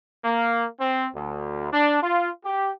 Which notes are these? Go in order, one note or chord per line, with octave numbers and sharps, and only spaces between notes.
A#3
C4
D2
D4
F4
G4